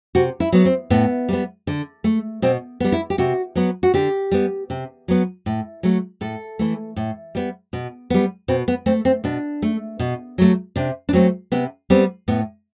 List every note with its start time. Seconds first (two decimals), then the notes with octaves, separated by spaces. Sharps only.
0.15 C3 F#4
0.40 E4
0.52 F#3 B3
0.65 C4
0.90 A2 B3
1.29 G3 B3
1.67 D3
2.04 A3
2.42 B2 C4
2.80 G3 B3
2.92 E4
3.10 G4
3.18 C3 F#4
3.55 F#3 B3
3.83 F#4
3.94 D3 G4
4.31 G3 B3
4.70 C3
5.08 F#3 B3
5.46 A2
5.83 F#3 A3
6.21 A2 A4
6.59 E3 A3
6.96 A2
7.35 G3 B3
7.73 B2
8.10 G3 B3
8.48 B2 C4
8.68 B3
8.86 A3 C4
9.05 C4
9.24 B2 D4
9.62 A3
9.99 B2
10.38 F#3 A3
10.76 C3 D4
11.09 D4
11.13 F#3 A3 C4
11.52 C3 B3
11.90 G3 B3 C4
12.28 A2 B3